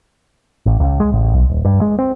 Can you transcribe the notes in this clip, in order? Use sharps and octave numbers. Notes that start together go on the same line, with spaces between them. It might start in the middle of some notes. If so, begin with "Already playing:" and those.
A1
C#2
G#3
A1
B1
D#1
G2
G#3
C4